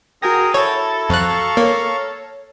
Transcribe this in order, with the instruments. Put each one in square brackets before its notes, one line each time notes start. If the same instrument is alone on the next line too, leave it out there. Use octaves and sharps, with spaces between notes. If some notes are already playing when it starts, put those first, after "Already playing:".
[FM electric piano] F#4 G#6 A#6 [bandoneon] G#4 G5 D#6 [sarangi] A#4
[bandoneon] E4 [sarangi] A4 [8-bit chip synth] C#5
[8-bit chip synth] F2 F#6 [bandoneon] F5 A#5 C#6
[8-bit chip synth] A#3 [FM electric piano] C#5